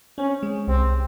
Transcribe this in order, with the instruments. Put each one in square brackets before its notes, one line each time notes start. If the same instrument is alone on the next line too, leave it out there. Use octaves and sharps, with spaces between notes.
[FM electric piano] C4 [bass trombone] C#4
[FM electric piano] G#3
[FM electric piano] C2 [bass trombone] C4